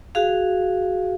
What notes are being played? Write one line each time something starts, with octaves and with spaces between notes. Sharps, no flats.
F#4 G#4 F5